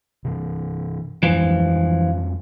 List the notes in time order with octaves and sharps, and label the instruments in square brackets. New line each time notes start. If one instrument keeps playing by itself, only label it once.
[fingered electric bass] C3 E3
[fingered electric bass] F2 G3 G#3 [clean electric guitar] E3 F3